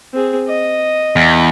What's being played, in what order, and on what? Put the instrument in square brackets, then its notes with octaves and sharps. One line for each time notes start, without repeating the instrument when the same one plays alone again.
[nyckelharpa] C4 G#4
D#5
[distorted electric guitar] E2